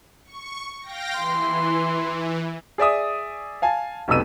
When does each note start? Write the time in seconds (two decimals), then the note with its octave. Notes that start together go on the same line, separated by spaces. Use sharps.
0.25 C#6
0.81 F5 G5 A#6
1.17 E3 C6
2.78 G#4 D5 E5 D#6
3.62 F5 G#5 A5
4.08 F1 B1 F2 B3 E6 D#7